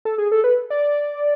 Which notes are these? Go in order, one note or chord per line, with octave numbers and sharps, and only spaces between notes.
A4
G#4
A4
B4
D5